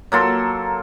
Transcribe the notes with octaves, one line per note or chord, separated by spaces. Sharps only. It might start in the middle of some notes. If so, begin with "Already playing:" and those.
F#3 A#3 A4 C6